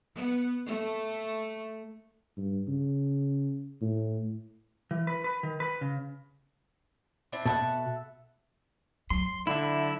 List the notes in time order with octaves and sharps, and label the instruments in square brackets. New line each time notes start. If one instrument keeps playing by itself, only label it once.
[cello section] B3
A3
[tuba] G2
C#3
A2
[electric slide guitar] E3
B4
B4
D#3
B4
C#3
[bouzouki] C4 D4 E4
[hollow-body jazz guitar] B2 [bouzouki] A4 E5 F#5
[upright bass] F#3 [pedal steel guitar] C6
[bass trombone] D3 [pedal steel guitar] E4 E5